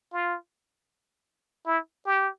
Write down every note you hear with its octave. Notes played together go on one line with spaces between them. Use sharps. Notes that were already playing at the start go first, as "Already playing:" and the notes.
F4
E4
G4